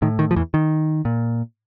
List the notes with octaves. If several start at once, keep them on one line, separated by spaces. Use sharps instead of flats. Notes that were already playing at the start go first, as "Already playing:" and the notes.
A2 D#3
D#3
F3
E2 E3
D#3
A#2